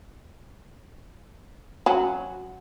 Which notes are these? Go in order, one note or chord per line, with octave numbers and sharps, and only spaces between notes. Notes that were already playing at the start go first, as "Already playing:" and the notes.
F#3 C#4